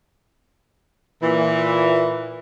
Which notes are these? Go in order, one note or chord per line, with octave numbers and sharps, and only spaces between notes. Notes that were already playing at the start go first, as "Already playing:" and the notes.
A#2 E3